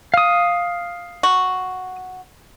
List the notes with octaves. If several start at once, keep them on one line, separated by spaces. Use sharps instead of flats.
F5 D#6
F#4